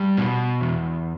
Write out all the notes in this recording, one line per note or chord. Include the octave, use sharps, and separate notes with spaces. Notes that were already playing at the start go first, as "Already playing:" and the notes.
Already playing: G3 A5
B2
E2